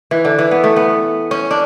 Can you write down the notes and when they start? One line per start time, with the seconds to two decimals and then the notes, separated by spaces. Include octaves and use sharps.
0.11 E3
0.25 D3
0.39 E3
0.51 B3
0.64 A3
0.76 B3
1.31 C#4
1.51 D4